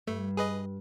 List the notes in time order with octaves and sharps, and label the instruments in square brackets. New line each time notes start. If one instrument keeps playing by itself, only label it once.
[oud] G2 [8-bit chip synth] A3
[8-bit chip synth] G#4 B4 D#5